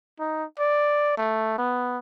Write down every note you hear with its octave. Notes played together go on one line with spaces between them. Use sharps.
D#4
D5
A3
B3